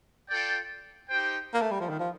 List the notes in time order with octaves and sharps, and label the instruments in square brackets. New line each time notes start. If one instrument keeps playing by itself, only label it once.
[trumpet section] F4 A4 D5 G5
D#4 G4 C5 G5
[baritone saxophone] A#3
A3
G3
F3
D#3
F3